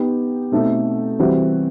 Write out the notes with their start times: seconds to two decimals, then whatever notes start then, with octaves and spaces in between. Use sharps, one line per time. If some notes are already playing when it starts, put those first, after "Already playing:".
Already playing: B3 D#4 G4
0.52 B2 A3 C4 D#4 A4
1.19 C3 E3 G3 C4 F#4